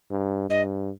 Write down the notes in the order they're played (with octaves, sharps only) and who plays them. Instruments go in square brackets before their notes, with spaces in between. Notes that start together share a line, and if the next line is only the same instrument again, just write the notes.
[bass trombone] G2
[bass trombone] G2 [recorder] D#5